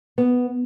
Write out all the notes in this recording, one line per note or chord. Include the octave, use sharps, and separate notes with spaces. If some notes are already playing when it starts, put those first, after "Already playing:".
B3